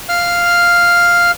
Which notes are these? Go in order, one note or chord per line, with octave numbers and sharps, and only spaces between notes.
F5 F6